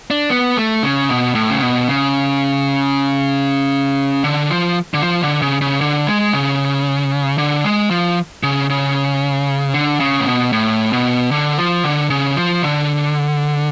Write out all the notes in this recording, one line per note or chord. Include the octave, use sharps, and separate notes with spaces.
D4
B3
A3
C#3
B2
A2
C#3
B2
C#3
D3
F3
D3
F3
D3
C#3
C#3
D3
G#3
C#3
D3
G#3
F3
C#3
C#3
D3
C#3
A2
B2
A2
B2
D3
F3
D3
C#3
F3
D3